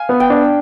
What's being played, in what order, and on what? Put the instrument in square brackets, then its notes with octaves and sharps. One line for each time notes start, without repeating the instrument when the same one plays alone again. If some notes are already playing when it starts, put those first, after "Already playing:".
Already playing: [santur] F5 G#5
[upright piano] B3
[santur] G5
[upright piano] D4